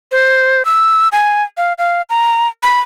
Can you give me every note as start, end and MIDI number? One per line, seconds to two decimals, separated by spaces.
0.12 0.65 72
0.65 1.08 88
1.12 1.43 80
1.57 1.73 77
1.78 2.02 77
2.10 2.48 82
2.63 2.81 83